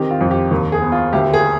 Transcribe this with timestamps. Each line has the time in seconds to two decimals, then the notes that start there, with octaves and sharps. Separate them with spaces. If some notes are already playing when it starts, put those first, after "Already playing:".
Already playing: D#3 C4 G4
0.11 F4
0.21 F2
0.31 G4
0.51 D#2
0.72 G#4
0.82 B3
0.92 F4
1.13 D2 G4
1.34 G#4